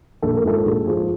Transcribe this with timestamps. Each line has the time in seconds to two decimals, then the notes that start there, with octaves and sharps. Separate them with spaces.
0.22 A#1 A4
0.35 A#4
0.44 G#2 F3 G#3 A4
0.65 A#1 G#4
0.86 G#2 F3 G#3 G#4